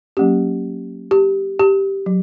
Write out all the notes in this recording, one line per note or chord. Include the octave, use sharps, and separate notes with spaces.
F#3 A#3 C#4 G4
G4
G4
F#3